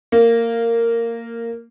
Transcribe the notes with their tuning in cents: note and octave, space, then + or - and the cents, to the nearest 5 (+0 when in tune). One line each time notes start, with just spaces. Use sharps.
A#3 -15